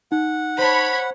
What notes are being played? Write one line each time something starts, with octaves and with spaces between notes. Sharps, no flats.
D#4 F#5
C5 C#5 A5 B5